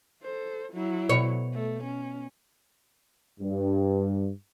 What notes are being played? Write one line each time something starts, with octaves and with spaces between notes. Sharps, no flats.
A4 C5
F#3 E4
B2 C#5
A3
C#4
G2